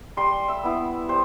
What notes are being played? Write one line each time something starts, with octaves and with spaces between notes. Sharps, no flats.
G3 C6
E5
B3 E4
G3 C5